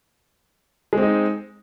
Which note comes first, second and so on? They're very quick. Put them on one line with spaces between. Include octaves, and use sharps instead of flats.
G#3 C4 D#4